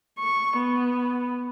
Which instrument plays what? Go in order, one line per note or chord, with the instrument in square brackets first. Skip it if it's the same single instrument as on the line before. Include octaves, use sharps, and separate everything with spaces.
[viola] C#6
B3